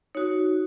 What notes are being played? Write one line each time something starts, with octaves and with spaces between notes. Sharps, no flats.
D#4 F#4 C#5